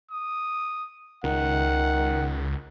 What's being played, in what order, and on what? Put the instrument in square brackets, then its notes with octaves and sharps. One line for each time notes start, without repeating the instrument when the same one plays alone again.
[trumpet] D#6
[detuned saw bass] C#2 [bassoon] D#3 [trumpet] F#5